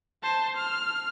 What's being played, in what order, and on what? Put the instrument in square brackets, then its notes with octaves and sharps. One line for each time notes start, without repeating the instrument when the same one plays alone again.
[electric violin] C5 A5
F6